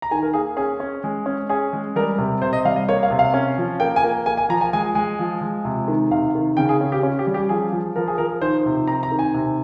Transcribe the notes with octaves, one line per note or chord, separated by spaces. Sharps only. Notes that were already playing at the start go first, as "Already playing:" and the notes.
A#5
D#3 G#5
A#4
A#3 G#4
C#4 G#4
C#4
G#3
C#4
C#4 G#4
G#3
G3 A#4
C3
C3 C5
D#5
G3 F5
D#5
A#3 C#5
F5
C3
F5
C#4
F3
A#3 G5
G#5
A#3
A#3 G#5
G#5
F3 A#5
G#5
G#3 G#5
G#3 G#5
F3
G#3
C3
D#3
C3 F5
D#3
C#3 G5
G#4
C#4
G4
C#4 F4
G4
G3
G4
F3 G#4
F3
F3 A#4
G#4
F3 A#4
D#3 C5
C3
C4 A#5
A#5
D#3
G#5
C3